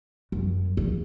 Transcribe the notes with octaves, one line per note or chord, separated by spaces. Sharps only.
F#2
E2